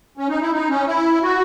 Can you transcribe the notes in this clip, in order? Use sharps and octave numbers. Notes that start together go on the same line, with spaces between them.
C#4
D#4
E4
D#4
C#4
E4
F#4